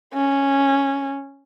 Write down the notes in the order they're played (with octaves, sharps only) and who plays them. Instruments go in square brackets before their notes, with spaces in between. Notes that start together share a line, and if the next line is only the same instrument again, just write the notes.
[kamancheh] C#4